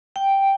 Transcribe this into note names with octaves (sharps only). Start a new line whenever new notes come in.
G5